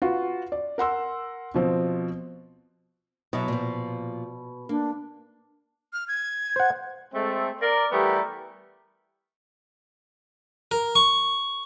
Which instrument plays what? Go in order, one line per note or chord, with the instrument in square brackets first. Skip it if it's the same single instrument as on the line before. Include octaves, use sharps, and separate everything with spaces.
[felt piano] F4 F#4 B4
D5
A#4 F#5 C6 E6
B2 F3 C4
[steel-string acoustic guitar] B2 [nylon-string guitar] F#3 E4
[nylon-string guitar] A#2 F3
[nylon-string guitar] A#3 [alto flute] D4
[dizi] F6
G#6
[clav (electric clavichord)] C5 F#5
[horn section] G#3 A3 C4
A#4 D5
E3 G3 A3 B3 G4 A#4
[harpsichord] A#4
C#6